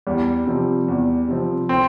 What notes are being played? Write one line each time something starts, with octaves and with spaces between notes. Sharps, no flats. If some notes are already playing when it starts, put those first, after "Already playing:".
E2 G3
C3 F3 C4
E2
C3 F3 C4
C4